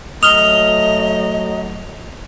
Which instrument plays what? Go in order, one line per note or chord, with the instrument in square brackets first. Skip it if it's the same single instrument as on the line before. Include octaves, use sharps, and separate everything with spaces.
[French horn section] F#3 A3 [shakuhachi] D#5 [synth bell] D#6 F6 G7 [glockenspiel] F7